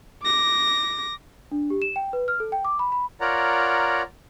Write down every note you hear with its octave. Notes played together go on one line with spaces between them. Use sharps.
D6 A#6
D4
G4
E7
G5
B4
F6
A4
G5
D6
B5
B5
F4 A#4 C#5 D5 F#5 A#5